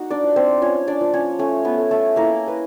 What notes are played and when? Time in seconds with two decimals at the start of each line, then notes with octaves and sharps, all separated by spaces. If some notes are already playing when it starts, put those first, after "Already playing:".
Already playing: A#3 D#4 F#4 F#5
0.10 D4 D5
0.23 F3
0.36 C4 C5
0.62 C#4 F4 C#5
0.87 D4 D5
1.01 F3
1.14 C#4 C#5
1.39 A3 C#4 C#5
1.65 B3 B4
1.78 A3
1.91 A3 A4
2.16 A#3 E4 A#4
2.48 B4